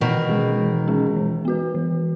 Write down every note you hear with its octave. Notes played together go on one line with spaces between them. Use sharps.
B2 D#3 E3
G#3 C#4 G#4
E3
G#3 C#4 G#4
E3
B3 F#4 B4
E3